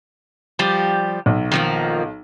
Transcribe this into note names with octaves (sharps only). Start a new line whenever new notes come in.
F3 G3 G4
B1
D#3 F3 A#3